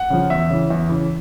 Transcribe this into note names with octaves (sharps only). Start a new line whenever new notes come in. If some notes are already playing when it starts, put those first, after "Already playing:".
Already playing: F#5
C#3 F3
E2 E5
C#3 E3
E2
C#3 E3